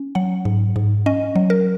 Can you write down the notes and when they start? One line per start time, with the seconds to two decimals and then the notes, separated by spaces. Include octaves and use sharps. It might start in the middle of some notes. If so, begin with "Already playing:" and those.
Already playing: C#4
0.15 F#3 F#5
0.45 G#2
0.76 G#2
1.06 C#4 D#5
1.36 F#3
1.50 A#4